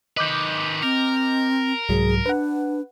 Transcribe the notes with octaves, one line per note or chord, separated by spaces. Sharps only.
D#3 B4 D#5 D6 G6
C4 A#4
C2 G#2 F#3 G#4
D4 B4 F#5